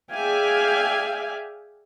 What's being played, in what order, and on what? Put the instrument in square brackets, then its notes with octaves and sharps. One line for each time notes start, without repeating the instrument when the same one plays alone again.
[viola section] G#4 D5 E5 F5 G5 G#5